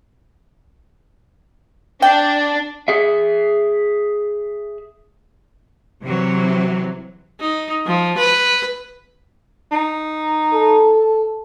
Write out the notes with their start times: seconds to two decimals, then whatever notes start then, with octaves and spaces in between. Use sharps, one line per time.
2.02 D4 G5
2.88 G#4 E5
6.03 C3 E3 F#3
7.40 D#4
7.86 F3
8.18 B4
9.72 D#4
10.53 A4